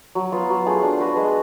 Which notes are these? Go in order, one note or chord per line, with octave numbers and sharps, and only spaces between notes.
F#3
B3 F4
F#3
A3 F4 G#4
D4
F#4 B4
G#3